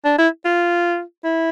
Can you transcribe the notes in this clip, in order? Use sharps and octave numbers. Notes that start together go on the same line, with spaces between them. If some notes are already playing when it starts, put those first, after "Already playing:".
D4
E4
F4
E4